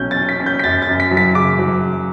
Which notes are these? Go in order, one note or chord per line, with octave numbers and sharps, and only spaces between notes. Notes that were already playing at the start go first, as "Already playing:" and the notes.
Already playing: B1 F#3 C#4 G6
A6
C#4
B6
C#4
G6
B6
F#2 A6
A6
F#2
B6
F#3
B6
C#3 D6
F#3